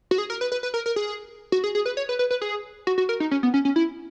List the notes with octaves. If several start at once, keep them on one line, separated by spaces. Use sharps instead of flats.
F#4
G#4
A#4
B4
B4
B4
A#4
A#4
G#4
F#4
G#4
G#4
B4
C#5
B4
B4
B4
G#4
F#4
F#4
A#4
D#4
C#4
B3
C#4
C#4
E4